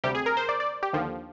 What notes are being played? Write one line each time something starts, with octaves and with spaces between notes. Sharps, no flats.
D2 C3 G3 G4
G#4
A#4
C5
D5
D5
G4
D#2 D3 F3